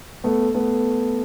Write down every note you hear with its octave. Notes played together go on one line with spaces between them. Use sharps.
A3 B3
A3 B3